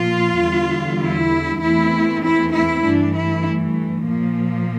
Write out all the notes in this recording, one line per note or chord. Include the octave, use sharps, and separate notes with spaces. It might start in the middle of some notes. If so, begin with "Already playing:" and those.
Already playing: A#2 F3 A#3 F4
E2 D3 G3
E4
E2 E3 A3 C4 E4
E4
E4
G2 E3 A3 D4
E4
A#2 F3 A#3